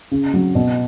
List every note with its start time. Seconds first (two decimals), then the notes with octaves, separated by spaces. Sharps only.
0.11 C#3
0.34 F#3
0.55 B2